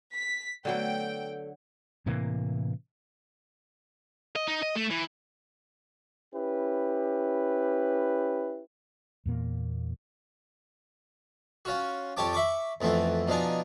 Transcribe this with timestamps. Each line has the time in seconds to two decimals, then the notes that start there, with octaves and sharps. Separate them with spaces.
0.14 B6
0.65 D3 F#3 A3 B3 G5
2.06 A2 C3 E3 A#3
4.36 D#5
4.48 D#4
4.63 D#5
4.76 A3
4.91 E3
6.34 C#4 E4 G4 B4
9.26 E2 A#2 A#3
11.65 C#4 F4 F#4
12.17 F2 G4 C#5 G5 A5 D6
12.33 E5 B5 C#6 D6
12.81 F2 E3 A3 B3 C4
13.28 B2 F3 D4 D#4 G#5